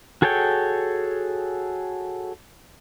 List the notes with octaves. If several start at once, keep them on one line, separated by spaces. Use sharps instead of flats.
F#4 G#4 A4 C#5 G5